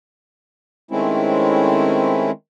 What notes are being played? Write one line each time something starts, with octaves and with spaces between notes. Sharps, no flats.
D#3 G#3 A3 C4 C#4 E4